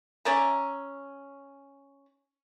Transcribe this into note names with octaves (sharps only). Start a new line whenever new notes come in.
C#4 D5 E5 A#5